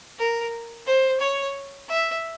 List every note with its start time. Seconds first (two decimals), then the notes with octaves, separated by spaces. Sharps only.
0.19 A#4
0.87 C5
1.21 C#5
1.89 E5